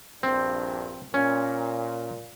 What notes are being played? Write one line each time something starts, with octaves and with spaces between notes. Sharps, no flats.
A#1 G2 C4 D4
A#2 C#4